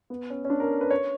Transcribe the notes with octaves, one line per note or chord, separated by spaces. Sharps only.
B3
C#4
C#4
D4
A#4
B4
C#5